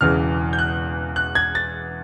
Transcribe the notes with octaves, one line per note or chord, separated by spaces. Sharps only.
E1 E2 C#3 E3 F6
G6
F#6
F#6
G#6
A6